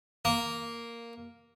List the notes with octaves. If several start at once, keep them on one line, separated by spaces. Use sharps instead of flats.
A#3